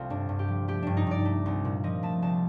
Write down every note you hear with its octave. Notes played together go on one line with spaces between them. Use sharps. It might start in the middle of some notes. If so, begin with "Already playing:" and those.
Already playing: C2 A3 C4 F4 A4
G2 D4
G2
G4
F3
A3 G4
G2 D4
D#4
G2 D5
A3
C2
A#2
F3 D#5
A3 A5
C2 A5